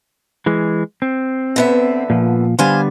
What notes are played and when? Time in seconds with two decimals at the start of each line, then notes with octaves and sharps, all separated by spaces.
0.46 E3 G#3
1.02 C4
1.56 D3 B3 E5
2.10 A#2 F3
2.59 D3 G3 B3 C5 F5 G#5